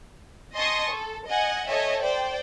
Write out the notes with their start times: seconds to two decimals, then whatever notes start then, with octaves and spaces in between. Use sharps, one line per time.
0.55 D#5 G#5 A5 C6 C#6 D#6
0.93 A4
1.28 D#5 F#5 G#5
1.67 A4 C#5 D#5 E5 G#5
2.01 C5 D5 G5